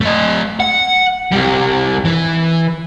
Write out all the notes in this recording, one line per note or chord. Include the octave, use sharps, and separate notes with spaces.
A3 D#5
F#5
C2 G3
E3